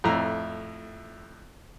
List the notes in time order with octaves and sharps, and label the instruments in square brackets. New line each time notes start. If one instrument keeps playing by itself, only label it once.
[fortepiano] F2 A2 E4 A#5